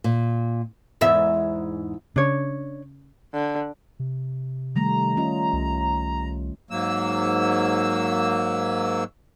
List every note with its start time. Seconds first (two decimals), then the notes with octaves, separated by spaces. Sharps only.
0.04 A#2
1.01 E2 G#2 E5
2.16 C#3 D4 C#5
3.33 D3
4.00 C3
4.76 D#3 G3 A3 A#5
5.17 C#4 F4 D#5
5.53 C2
6.71 G#2 F#3 A#3 E6